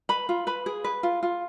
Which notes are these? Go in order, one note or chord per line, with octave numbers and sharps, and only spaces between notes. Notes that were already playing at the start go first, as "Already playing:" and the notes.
B4 B5
F4
B4 B5
G#4
B4
F4
F4